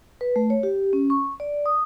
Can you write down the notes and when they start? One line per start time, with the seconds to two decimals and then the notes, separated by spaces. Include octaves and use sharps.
0.21 B4
0.36 A3
0.50 C#5
0.63 G4
0.93 C#4
1.10 C#6
1.40 D5
1.66 D#6